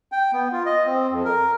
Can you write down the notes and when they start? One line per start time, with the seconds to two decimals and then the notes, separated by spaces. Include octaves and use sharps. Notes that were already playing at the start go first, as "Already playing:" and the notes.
0.12 G5
0.33 B3
0.52 F4
0.66 D#5
0.86 C4
1.11 F2
1.25 A#4